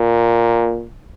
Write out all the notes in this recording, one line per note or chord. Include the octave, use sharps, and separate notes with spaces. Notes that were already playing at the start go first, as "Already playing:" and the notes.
Already playing: A#2